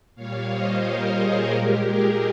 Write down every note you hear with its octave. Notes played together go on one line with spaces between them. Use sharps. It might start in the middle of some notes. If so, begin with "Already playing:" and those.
A#2 G3 C#5 F5
C5 D#5
A#4 C#5
G#4 C5
A#2 G#3 G4 A#4
G#4